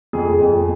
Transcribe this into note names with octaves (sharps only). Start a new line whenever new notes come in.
F2 G#4
F2